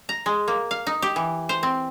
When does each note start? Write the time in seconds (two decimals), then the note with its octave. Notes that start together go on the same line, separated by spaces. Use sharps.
0.09 A#5
0.26 G#3
0.48 A#3
0.71 F5
0.87 D#4
1.02 G4
1.16 E3
1.49 C5
1.63 C4